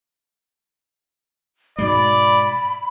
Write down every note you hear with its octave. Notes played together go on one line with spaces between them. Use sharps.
G#2 B2 G#3 D5 B5